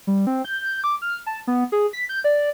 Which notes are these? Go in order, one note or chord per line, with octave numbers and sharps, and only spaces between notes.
G3
C4
G6
D6
F6
A5
B3
G#4
B6
G6
D5